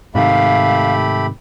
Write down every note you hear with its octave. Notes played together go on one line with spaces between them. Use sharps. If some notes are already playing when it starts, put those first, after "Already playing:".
G#2 C3 D#3 A3 G4 F5 B5